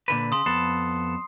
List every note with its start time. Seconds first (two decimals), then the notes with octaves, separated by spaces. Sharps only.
0.08 A#2 D3 B4
0.32 C#3 C6 D#6
0.46 F2 B3 A4 C7